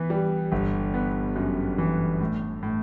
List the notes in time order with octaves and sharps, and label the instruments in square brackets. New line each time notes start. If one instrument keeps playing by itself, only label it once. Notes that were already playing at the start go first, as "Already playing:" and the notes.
Already playing: [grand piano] E3 B3
G3
G1
B3
F#2
E3
A2
A2